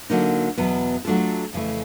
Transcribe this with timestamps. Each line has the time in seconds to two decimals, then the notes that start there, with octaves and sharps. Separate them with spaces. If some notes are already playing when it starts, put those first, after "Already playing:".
0.10 D3 F#3 A#3 D#4
0.58 E2 B2 F#3 B3
1.05 F#3 A3 D4 F4 A4
1.53 F2 C#3 E3 A3